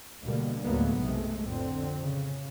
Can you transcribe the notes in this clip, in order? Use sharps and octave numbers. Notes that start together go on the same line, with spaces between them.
D2 B2 D3 G3 A#3
D2 A2 F#3 G#3 A#3 B3
B1 F#2 C3 G#3 A3
F2 A2 D3 C4
C#3